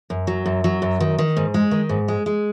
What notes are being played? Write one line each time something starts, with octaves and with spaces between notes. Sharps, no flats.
F#2
F#3
F#2
F#3
F#2
D#3
D#3
G#2
G#3
D#3
G#2
G#3
G#3